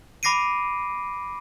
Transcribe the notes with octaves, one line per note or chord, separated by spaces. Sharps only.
B5 D6 A#6 C7 D7 D#7